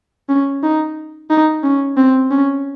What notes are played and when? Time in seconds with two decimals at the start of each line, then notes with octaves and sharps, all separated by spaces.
0.29 C#4
0.63 D#4
1.30 D#4
1.63 C#4
1.97 C4
2.31 C#4